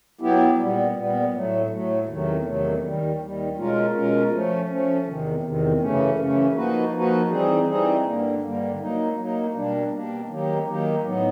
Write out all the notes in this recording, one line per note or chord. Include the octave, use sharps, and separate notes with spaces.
F#3 B3 E4 G4
A#2 G3 B3
A#2 G3 B3
A2 F#3 A3
A2 F#3 A3
E2 C3 D#3 F#3 A3
E2 C3 D#3 F#3 A3
D#2 D#3 G3
D#2 D#3 G3
B2 G#3 C#4 F4 A#4
B2 G#3 C#4 F4 A#4
F3 A3 C#4
F3 A3 C#4
E2 C3 D#3
E2 C3 D#3
F#2 C#3 E3 A3 C#4
F#2 C#3 E3 A3 C#4
F3 A#3 D#4 F#4 B4
F3 A#3 D#4 F#4 B4
E3 G3 C4 D#4 G#4
E3 G3 C4 D#4 G#4
G2 D3 G3 A#3
G2 D3 G3 A#3
F#3 A#3 D#4
F#3 A#3 D#4
B2 G3 A#3 D4
B2 G3 A#3 D4
D#3 F#3 A#3 D#4 G4
D#3 F#3 A#3 D#4 G4
A2 F#3 B3 D#4